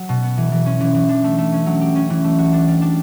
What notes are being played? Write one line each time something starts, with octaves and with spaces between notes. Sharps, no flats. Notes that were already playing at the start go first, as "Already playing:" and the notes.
Already playing: F#3
B2
B3
E3
E3
C#4
E3
E3
D4
A3
A3
C#4
F#3
G4
C#4
E3
A3
F#4
D4
G3
D4